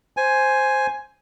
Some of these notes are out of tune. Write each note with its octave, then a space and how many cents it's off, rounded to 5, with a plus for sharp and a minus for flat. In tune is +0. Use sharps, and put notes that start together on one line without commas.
C5 +0 G#5 +5